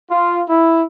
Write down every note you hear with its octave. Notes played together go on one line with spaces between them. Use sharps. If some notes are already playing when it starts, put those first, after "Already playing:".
F4
E4